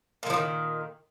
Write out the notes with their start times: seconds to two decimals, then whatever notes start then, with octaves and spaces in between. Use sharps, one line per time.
0.23 A#2
0.26 G#3
0.30 F3
0.33 D#3